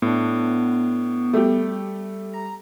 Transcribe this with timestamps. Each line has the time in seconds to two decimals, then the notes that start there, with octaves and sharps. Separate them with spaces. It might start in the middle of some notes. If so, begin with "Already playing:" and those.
0.02 A2 B3 D4
1.33 G3 A3 G4
2.33 A#5